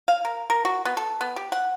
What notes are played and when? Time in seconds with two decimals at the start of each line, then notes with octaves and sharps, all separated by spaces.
0.08 F5
0.25 A#4
0.50 A#4
0.65 F#4
0.85 B3
0.97 A4
1.21 B3
1.36 G4
1.52 F#5